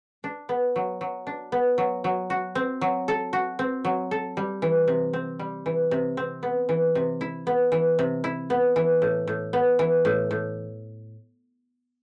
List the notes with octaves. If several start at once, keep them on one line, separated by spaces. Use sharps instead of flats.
D4
B3
F#3
F#3
D4
B3
F#3
F#3
F#4
C4
F#3
A4
F#4
C4
F#3
A4
G3
E3
C3
C4
G3
E3
C3
C4
B3
E3
C3
E4
B3
E3
C3
E4
B3
E3
A2
A2
B3
E3
A2
A2